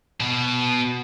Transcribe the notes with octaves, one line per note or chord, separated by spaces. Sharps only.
B2